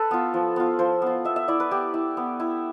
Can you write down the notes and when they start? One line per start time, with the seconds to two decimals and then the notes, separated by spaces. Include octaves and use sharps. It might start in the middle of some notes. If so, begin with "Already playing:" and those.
Already playing: A4 B4
0.11 B3 F4
0.34 F3
0.56 B3 F4
0.79 F3 C5
1.02 B3 F4
1.25 B3 E5
1.36 E5
1.48 E4 D5
1.60 B4
1.71 B3 G4
1.94 E4
2.17 B3
2.40 E4